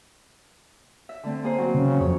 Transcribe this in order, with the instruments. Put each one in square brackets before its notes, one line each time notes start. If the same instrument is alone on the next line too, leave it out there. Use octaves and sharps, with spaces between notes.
[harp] E5
D3 A3 C4
A#3 G#4 C5
F#3 C4
[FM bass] C#3
[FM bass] F2 [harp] C#5